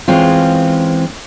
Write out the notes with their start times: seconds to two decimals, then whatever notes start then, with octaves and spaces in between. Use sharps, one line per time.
0.08 E3 G#3 C4 C#4 F4